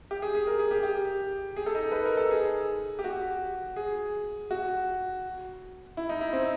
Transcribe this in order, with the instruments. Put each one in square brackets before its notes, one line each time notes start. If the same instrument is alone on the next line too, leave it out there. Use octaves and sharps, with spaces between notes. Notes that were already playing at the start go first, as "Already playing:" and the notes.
[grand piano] G4
G#4
G#4
A#4
G#4
G4
G4
G#4
A4
D#4
B4
A#4
A4
G#4
G4
F#4
G#4
F#4
E4
D#4
E4
C4